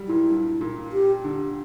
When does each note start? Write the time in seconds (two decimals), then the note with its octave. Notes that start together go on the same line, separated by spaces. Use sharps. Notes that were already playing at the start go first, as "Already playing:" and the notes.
Already playing: F#3 G3
0.08 A#2 E4
0.29 G2
0.61 A#2
0.92 G4
1.24 D3